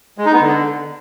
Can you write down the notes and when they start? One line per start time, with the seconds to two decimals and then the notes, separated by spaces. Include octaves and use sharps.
0.18 G#3
0.26 D#4
0.33 B3
0.41 D3